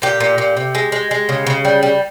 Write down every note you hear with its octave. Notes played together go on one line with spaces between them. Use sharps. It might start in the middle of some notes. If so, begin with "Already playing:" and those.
A#2 G4
A#2
A#2
C3
G#3
G#3
G#3
C#3
C#3
G3
G3